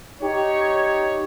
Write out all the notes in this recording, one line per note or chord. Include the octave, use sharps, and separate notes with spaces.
D#4 G4 C#5